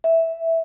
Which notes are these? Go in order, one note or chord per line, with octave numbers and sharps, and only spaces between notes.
E5